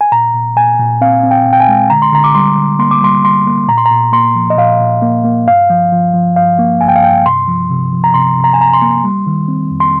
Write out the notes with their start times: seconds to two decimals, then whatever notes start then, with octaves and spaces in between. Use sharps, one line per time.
0.01 G#5
0.12 A#2 A#5
0.34 A#2
0.56 A#2 G#5
0.79 A#2
1.01 C4 F5
1.23 C4
1.31 G5
1.46 A#2
1.53 G5
1.60 G#5
1.68 G#3
1.90 D3 A#5
2.02 C6
2.12 D3 A#5
2.24 D6
2.35 G3 C6
2.57 D3
2.79 A#3 C6
2.91 D6
3.01 G3 C6
3.25 G3 C6
3.47 A#3
3.68 A#2 A#5
3.78 C6
3.86 A#5
3.91 A#2
4.13 A#3 C6
4.35 F3
4.50 D#5
4.57 A#2 F5
4.80 A#2
5.02 A#3
5.24 A#3
5.47 G2 F5
5.70 F3
5.92 F3
6.14 F3
6.36 G2 F5
6.59 A#3
6.81 G2 G#5
6.88 G5
6.96 F5
7.03 G2 G5
7.26 C3 C6
7.48 F3
7.70 C3
7.92 F3
8.04 A#5
8.14 C3 C6
8.37 C3
8.44 A#5
8.54 G#5
8.59 C3 A#5
8.73 C6
8.82 A#3
9.04 G3
9.27 D#3
9.48 C4
9.71 F2
9.80 C6